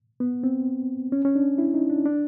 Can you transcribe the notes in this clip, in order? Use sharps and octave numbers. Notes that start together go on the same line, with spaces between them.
B3
C4
C#4
C#4
D4
E4
D#4
D4
D4